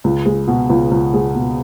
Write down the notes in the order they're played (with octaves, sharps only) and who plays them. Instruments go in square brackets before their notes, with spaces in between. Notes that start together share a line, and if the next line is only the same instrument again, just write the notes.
[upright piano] C#2
G#3
B2
C#2
C#2
G#3
B2